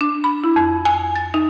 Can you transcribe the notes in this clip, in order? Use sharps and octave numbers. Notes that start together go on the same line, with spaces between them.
D4
B5
E4
F2
G#5
A6
D#4